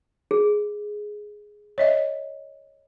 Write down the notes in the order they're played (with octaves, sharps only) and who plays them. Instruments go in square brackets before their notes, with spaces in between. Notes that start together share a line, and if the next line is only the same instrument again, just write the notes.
[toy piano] G#4
[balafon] C#5 D#5 E5